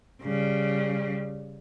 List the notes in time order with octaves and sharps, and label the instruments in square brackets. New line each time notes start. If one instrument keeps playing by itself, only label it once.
[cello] C#3 G3